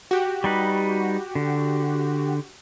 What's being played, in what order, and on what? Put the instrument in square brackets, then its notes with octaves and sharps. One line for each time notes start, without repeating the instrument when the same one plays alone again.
[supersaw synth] F#4 G4
[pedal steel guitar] G3 D#4 B4
D3